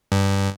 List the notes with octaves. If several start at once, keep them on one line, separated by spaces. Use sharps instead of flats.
G2